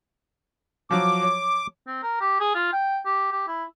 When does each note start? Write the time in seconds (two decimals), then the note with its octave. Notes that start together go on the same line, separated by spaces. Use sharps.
0.91 F3 F#3 D6
1.22 C#5
1.87 C4
2.03 A#4
2.20 G4
2.40 G#4
2.55 F4
2.73 G5
3.06 G4
3.32 G4
3.48 E4